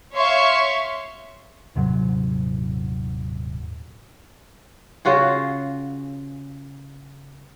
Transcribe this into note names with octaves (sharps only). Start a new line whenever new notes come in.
C#5 E5 F5 C6 C#6
D#1 G#2 C3 F#3
C#3 F4 F#4 G#4